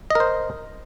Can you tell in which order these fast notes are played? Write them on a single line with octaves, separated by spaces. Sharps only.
D#5 A#4 C5